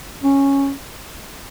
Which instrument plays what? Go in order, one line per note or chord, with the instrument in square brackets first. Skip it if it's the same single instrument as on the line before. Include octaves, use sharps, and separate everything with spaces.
[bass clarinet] C#4